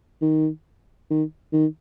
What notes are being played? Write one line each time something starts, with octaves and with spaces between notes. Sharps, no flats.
D#3
D#3
D#3